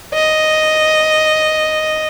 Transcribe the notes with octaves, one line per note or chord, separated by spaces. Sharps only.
D#5